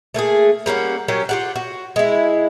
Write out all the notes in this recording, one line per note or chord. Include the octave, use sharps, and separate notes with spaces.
A3 A#3 F#4 G#4
G3 A#3 C#4 F#5
F#3 C#4 G4 A#4
F4 G4 F#5
F#4
G#3 E4